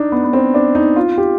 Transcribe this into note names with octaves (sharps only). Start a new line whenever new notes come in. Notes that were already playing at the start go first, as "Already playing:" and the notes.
Already playing: D4 D#4
B3
B3
C4
D4
D#4
F4
G4